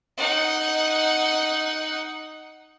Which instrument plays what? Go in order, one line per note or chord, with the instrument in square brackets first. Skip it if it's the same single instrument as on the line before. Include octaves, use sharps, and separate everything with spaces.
[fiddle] D#4 F#5